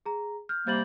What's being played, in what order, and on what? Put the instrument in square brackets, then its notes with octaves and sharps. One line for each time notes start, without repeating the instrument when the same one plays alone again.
[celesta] G#4 A#5
F6 G6
[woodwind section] C3 G3 A#3 [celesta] G6 A6 F#7